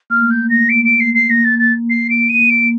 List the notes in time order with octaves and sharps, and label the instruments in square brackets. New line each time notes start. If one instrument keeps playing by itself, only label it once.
[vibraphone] A#3 [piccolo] F6
[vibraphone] A3
[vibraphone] A#3 [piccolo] G6
[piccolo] A#6
D7
D7
C7
C7
[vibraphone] A#3 [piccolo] A#6
[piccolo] A6
A6
C7
D7
D#7
[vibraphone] A#3 [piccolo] D7